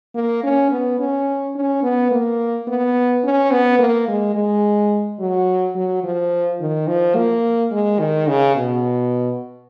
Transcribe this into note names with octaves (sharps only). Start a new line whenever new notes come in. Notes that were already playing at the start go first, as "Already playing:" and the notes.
A#3
C#4
B3
C#4
C#4
B3
A#3
B3
C#4
B3
A#3
G#3
G#3
F#3
F#3
F3
D#3
F3
A#3
G#3
D#3
C#3
B2